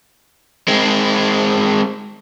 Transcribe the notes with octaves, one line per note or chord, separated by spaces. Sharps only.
G#3 C4